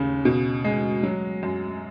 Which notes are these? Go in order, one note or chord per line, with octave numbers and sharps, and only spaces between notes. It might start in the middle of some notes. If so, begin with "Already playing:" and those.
Already playing: D#2 C#3
B2
G#3
F#3
F#2